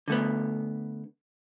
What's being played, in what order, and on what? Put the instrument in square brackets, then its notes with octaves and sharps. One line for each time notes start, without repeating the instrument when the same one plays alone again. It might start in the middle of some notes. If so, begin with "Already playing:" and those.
[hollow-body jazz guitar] D3 A3 B3